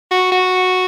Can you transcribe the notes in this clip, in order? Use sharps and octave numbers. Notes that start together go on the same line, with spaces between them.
F#4
F#4